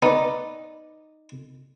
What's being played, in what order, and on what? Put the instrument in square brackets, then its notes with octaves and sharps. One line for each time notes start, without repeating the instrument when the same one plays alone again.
[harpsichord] B3 [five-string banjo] D#4 D5